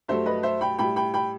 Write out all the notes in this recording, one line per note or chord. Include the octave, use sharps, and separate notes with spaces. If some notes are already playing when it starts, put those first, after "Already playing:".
G2 F#3 A3 C5 E5
B4 D#5
C5 E5
G5 B5
A2 G3 G5 B5
G5 B5
G5 B5